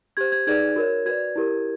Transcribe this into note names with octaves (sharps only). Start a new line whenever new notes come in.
G4 C5 G#6
G#6
D#4 G#4 B4 D5 G#6
F#4 A#4 C#5
F#4 B4 D5 G#6
E4 G4 A#4